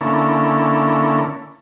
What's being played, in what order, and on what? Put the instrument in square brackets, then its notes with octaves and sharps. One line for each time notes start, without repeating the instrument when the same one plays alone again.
[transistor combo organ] D3 A#3 C#4 E4 A4